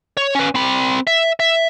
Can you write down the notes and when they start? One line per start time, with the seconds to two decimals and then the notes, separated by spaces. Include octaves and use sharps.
0.17 C#5
0.35 C#4 B4
0.55 C4 B5
1.07 E5
1.40 E5